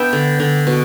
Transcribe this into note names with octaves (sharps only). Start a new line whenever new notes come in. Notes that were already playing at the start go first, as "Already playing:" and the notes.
Already playing: B3 D4 E5 G5
D3
D3
B2